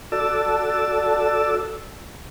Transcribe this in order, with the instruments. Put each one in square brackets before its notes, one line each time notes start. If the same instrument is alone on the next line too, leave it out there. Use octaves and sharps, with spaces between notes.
[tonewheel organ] F#4 A4 D5 A5 E6